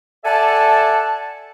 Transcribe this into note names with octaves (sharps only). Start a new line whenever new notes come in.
A4 D5 E5 F#5 G#5 A5